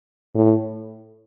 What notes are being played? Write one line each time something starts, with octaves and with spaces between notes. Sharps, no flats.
A2